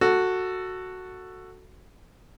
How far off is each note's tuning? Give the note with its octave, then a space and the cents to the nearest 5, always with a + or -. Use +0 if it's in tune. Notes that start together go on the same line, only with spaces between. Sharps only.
F#4 +0 A4 +15